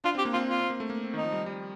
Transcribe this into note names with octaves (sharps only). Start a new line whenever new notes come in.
D4 F4
C4 G4
A#3
C4 F4
F4
C4
A#3
A3
A#3
C4
D#3 D#4
F3
G3
G3